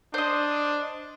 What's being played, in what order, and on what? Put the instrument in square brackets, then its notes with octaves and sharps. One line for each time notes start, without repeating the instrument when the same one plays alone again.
[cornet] D4 [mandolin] C5 D#5